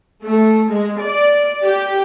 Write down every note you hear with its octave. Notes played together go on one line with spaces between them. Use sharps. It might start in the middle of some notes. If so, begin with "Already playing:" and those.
A3
G#3
D5
G4